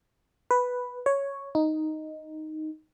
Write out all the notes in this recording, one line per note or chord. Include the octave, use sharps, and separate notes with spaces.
B4
C#5
D#4